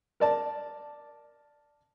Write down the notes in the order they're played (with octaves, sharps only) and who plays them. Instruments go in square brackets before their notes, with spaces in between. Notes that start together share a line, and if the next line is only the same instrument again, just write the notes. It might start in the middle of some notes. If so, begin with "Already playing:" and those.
[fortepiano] A#4 D5 A5